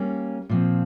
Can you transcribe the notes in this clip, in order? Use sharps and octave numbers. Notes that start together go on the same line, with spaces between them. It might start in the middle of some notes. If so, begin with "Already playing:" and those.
Already playing: G3 A#3 C#4
A#2 F3 C4